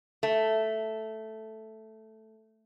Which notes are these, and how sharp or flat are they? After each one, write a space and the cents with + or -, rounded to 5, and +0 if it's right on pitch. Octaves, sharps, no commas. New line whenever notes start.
A3 +0